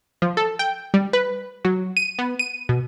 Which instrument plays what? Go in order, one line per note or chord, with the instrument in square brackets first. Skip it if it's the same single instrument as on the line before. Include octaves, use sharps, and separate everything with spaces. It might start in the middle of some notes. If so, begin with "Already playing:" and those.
[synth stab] F3
A4
G5
G3
B4
F#3
D#7
B3
D#7
B2